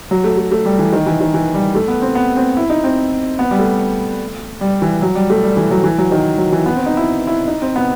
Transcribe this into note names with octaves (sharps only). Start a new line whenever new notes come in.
F#3
A3
A3
A3
G3
E3
D#3
E3
D#3
E3
G3
A3
B3
C4
B3
C4
E4
D#4
C4
B3
G3
A3
G3
E3
F#3
G3
A3
G3
E3
F#3
E3
F#3
D#3
F#3
E3
B3
C4
D#4
E4
E4
D#4
C4
B3